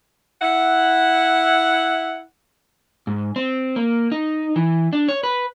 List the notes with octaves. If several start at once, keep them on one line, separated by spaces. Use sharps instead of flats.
E4 F#5
G#2
C4
A#3
D#4
E3
D4
C#5
B4